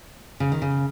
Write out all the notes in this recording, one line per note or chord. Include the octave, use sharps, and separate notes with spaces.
C#3
D#3
C#3